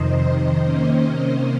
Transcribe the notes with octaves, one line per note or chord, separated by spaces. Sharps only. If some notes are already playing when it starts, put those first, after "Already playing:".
Already playing: F2 C3 D#3 C5 D#5
C3 D#3 A#3 C#4